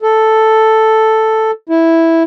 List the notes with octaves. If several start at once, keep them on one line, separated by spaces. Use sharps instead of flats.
A4
E4